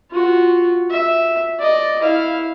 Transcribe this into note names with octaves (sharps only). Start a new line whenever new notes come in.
F4 F#4
E5
D5 D#5
E4 F5